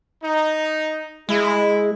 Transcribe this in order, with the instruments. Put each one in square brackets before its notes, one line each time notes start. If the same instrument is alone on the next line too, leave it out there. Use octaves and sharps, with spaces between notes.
[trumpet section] D#4
[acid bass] G#3 [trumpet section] E4 [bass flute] G#4